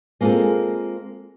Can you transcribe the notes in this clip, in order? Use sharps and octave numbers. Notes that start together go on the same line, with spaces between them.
G#3 A#3 C4 F4 G#4 A4